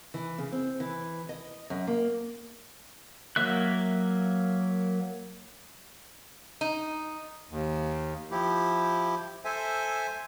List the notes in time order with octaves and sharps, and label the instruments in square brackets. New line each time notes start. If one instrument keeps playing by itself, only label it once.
[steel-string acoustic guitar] E3
C#3
C4
E3
D#5
F#2
A#3
[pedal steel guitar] F#3 A#3 E5 F#6
[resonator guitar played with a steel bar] D#4
[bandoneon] D#2
F3 E4 G4
A4 C5 E5 G#5